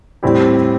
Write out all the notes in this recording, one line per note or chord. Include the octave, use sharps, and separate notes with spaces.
A2 G3 C4 E4 G4